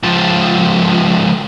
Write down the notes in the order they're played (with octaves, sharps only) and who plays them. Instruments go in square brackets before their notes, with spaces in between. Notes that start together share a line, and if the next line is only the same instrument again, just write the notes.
[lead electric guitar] C#2 F3